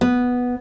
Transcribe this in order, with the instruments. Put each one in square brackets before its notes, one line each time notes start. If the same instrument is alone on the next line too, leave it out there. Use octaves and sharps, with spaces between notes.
[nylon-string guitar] B3